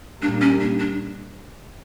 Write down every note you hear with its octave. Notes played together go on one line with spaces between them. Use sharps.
A#2 G3 A#3 D4
C#4
D4
D4